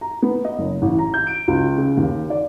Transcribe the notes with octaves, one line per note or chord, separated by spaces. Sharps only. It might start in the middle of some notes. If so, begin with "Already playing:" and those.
A#5
B3
D#5
F#1
A1
A#5
G6
D7
C#2
C#3
D#2
D5